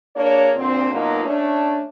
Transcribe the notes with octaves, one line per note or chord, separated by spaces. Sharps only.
A#3 D4 G#4 C#5
D2 A#2 D3 C4
F#2 B2 A#3 B3 D#4 F4
A3 C#4 D4